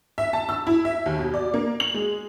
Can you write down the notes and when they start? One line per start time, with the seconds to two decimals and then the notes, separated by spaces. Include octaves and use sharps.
0.18 E5
0.33 A5
0.49 E6
0.67 E4
0.85 E5
1.06 D#2
1.18 B2
1.34 D5
1.54 A#3
1.80 F#7
1.94 G#3